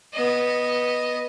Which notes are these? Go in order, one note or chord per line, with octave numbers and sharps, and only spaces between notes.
B3 D#5